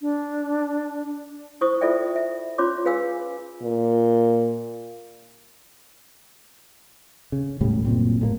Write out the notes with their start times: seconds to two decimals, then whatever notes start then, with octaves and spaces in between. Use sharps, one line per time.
0.01 D4
1.61 E4 C5 C#6 D#6
1.81 E4 F4 A4 D5 E5 G5
2.16 E5
2.58 C#4 F4 C#5 C6 D6
2.85 F4 G#4 B4 F5 G#5 E6
3.62 A#2
7.32 C#3
7.60 E1 A2 C#3 G3
7.85 F#1 A#2 C4
8.21 A2 G3 A#3